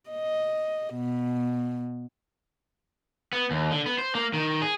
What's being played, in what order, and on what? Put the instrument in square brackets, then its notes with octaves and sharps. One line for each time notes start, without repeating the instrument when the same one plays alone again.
[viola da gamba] D#5
B2
[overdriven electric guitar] B3
D#2
D3
B3
C5
A#3
D#3
G#4